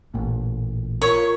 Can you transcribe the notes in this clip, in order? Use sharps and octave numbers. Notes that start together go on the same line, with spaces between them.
A1 A#2
F4 A#4 C#5